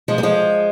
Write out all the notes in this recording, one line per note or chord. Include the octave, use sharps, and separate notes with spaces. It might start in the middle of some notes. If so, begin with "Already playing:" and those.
F3 G#3
G3
F3 G#3